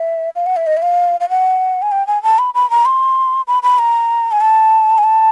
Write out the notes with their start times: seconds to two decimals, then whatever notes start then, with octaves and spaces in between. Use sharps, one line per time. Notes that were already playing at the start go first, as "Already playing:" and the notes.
Already playing: E5
0.36 F5
0.46 F#5
0.56 E5
0.67 D#5
0.77 E5
0.82 F5
1.20 F5
1.29 F#5
1.82 G#5
1.92 G5
2.07 G#5
2.23 A5
2.39 B5
2.54 B5
2.70 A#5
2.85 C6
3.48 B5
3.63 B5
3.79 A#5
4.32 G#5
4.41 A5
4.98 G#5
5.04 A5